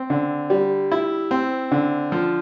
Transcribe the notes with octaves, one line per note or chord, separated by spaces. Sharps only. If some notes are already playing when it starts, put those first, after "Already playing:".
Already playing: C4
D3
G3
E4
C4
D3
F3